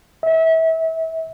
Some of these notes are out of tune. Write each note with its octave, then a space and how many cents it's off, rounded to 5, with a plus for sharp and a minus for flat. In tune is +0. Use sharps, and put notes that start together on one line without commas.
E5 -30